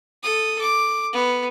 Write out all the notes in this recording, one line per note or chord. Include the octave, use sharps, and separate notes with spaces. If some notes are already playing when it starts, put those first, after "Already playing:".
A4 D#6
D6
B3